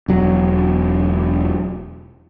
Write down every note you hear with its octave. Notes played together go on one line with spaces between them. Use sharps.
E1 F#3